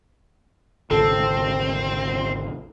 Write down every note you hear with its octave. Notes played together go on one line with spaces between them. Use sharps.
G#1 D2 C3 C4 A4